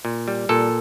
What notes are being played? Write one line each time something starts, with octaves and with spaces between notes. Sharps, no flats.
A#2
G3
A#2 A4